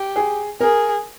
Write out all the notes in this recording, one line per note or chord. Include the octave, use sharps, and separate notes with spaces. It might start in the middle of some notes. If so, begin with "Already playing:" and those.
Already playing: G4
G#4
G#4 A#4